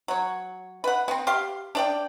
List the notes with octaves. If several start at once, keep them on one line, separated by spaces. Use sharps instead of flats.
F#3 C#5
B4 F#5
B3 C4
G4 F5 C6
D4 D5 G5